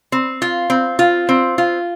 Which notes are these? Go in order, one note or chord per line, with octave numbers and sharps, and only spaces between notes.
C4
F4
C4
F4
C4
F4